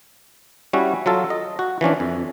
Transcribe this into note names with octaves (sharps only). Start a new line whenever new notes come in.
G3 C#4 E4 F#4
F#3 F4 A4
D#5
F#4
E3 F3 C#4 D4
F2